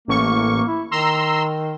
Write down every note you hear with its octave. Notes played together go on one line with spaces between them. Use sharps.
A1 A#3 C#6
E4
D#3 A#5 C6 E6